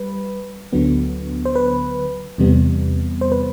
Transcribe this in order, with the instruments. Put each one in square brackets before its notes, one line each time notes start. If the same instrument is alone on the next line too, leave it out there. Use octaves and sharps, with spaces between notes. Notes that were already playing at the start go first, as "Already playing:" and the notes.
Already playing: [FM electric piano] G3 B4
D2 D3 F#3 B3
C5
B4
E2 C3 G3 B3
C5
B4